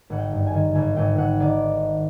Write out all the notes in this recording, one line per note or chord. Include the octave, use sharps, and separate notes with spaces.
G#1 F#5
G5
G2
G#5
D#3
G#1 G#5
G#1 G5
G#1 F#5
D#3 D5